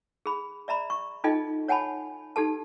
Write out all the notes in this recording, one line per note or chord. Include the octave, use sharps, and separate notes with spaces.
G#4 B5
D5 E5 A#5 B5
C#6
D#4 F4 A4 D#5 G5
C#5 F#5 G#5 A5 B5
D#4 G4 A4 A5